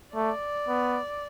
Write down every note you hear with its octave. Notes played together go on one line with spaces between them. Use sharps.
A3 D5
B3